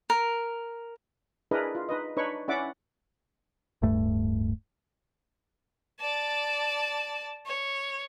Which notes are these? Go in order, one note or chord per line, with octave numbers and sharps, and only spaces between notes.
A#4
D4 E4 G#4 A#4 B4 D#5
F4
D#4 B4 D#5
D4 D#4 B4 C#5 B5 C#6
C#4 E4 D5 E5 F#5 D6
D1 G2 A3
D5 A5
C#5